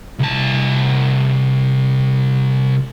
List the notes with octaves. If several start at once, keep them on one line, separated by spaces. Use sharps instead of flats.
C2 A5